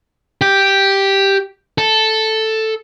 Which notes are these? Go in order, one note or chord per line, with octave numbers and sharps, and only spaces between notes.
G4
A4